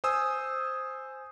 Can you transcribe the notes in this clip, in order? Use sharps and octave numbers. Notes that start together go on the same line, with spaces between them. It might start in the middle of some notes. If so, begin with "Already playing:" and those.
C5 G#5 D#6 E6